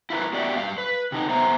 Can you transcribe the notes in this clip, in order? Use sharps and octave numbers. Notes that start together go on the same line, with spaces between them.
E4 F4 A#4 B4
B3 F#4 G4 D5 E5 F#5
G2 F5
B4
C3 D#4
B3 C5 E5 A#5